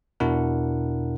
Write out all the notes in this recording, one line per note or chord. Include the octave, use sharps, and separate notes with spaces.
E2 B2 D4 E4 A#4 F#5